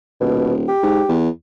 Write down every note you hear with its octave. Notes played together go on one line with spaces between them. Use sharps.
D#1 B2
G4
G#2
E2